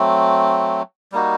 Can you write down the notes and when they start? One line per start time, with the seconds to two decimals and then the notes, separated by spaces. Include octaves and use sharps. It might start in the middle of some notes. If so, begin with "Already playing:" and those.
Already playing: F#3 A3 C4
1.12 G3 A#3 D#4 F#4